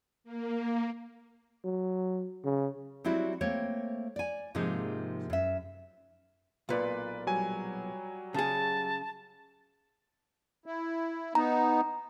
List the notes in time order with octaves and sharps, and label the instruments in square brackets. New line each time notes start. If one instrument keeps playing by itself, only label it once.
[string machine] A#3
[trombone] F#3
C#3
[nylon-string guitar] F#3 G3 C4 E4 F#4
A3 A#3 C4 C#5 G5
D5 G#5
G#2 C3 F3 A#3 D#4 G#4
F#2 E5
[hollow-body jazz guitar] B1 A#2 [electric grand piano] F4 B4 D5
[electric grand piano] F#3 G3 G#5
[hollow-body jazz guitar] C#3 G#4 [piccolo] A5
[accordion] E4
[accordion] B3 D#4 [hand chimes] A#5